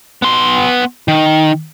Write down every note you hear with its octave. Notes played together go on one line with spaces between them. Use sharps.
B3 C6
D#3